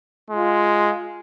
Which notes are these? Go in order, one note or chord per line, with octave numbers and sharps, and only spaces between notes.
G#3 F4